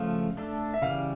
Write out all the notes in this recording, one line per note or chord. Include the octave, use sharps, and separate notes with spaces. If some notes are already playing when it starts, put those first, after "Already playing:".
Already playing: C#3 F3 A3 F5
A3 D4 A4
E5
C#3 E3 G3 F5